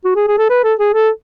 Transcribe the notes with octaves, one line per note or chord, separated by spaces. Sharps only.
F#4
G#4
G#4
A4
B4
A4
G#4
A4